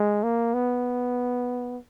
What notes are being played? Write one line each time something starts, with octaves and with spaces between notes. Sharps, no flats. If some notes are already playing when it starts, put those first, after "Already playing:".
Already playing: G#3
A#3
B3